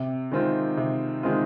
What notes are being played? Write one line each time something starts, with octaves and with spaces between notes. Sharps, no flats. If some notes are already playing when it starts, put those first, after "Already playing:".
Already playing: C3
D#3 G#3 C4 F4
C3
D#3 G#3 C4 F4